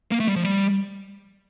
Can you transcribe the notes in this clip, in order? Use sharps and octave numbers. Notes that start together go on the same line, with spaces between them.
A#3
A3
G3
F3
G3